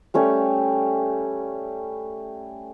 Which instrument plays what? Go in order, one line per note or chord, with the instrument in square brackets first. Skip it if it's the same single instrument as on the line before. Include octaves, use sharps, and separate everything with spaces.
[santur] G3 A3 C#4 G4